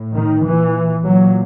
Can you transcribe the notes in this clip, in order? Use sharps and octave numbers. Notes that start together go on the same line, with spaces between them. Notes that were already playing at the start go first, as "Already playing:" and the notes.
Already playing: A2
D#3
A#2 E3
A#2 F#3